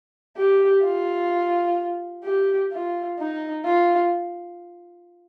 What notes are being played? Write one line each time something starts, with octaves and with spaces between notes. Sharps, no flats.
G4
F4
G4
F4
D#4
F4